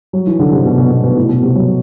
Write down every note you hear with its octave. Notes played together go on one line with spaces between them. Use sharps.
F#3
E3
D3
C3
B2
B2
B2
B2
A2
B2
C3
F#3